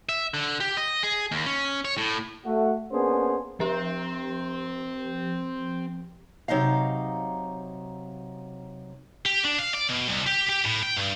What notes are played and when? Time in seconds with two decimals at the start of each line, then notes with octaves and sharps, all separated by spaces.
0.09 E5
0.34 D3
0.60 G4
0.77 D#5
1.03 G#4
1.31 D#2
1.46 C#4
1.85 C#5
1.98 A2
2.45 A3 F#4
2.92 A#3 B3 C#4 D4 G#4 C5
3.60 F3 C4 G4
6.48 C3 F#3 D#4 D#5 F5
9.26 G4
9.44 D4
9.58 F5
9.74 D5
9.89 B2
10.09 C2
10.27 G4
10.49 G4
10.65 A2
10.83 G5
10.96 G2